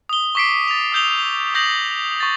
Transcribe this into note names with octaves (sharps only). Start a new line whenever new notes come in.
D#6 G7
C#6 D6 B6 C7 D7
A6 F7
D#6 E6 G6 F7 G7
D#6 G6 A#6 C7 F#7
C#6 A6